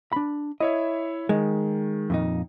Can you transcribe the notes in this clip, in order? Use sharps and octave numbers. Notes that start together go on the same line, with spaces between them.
D4 B5
E4 C#5 D#5 E5
D#3 G#3
F2 A#2 D#4